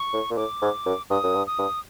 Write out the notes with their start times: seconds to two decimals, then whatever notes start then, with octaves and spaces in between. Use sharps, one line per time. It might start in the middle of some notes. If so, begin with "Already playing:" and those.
Already playing: C#6
0.13 A2
0.30 A#2
0.37 A2 D6
0.62 G#2
0.86 F#2
1.10 G2 D#6
1.24 F#2
1.35 G2
1.47 D#6
1.59 G2